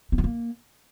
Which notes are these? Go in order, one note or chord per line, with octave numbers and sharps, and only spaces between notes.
C4
B3
A#3